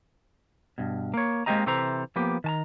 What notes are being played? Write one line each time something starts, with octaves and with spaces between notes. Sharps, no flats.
G2 B2
A#3 C#5
G#3 A#3 C4 G4 D#5 A#5
C3 E3 A4 C5 A#5
F3 A#3 B3 G4
D#3 A5 A#5